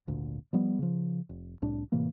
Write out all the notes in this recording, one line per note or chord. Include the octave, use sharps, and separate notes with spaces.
G#1 D2 A#2 D3
F3 G3 B3
C#3 F3
F1
C2 A2 D4
A2 C3 E3 A#3